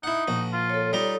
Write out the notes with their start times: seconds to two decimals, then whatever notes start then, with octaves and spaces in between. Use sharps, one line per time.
0.03 D#4 E4 F#5
0.28 A#1 F#4
0.53 F4
0.70 A4 C#5
0.93 G3 D#4 F4 A#5